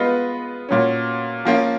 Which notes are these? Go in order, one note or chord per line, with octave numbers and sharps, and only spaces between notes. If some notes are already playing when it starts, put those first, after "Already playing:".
Already playing: G#3 B3 F4 B4 D#5
A#2 F#3 C#4
F3 A#3 C#4 F4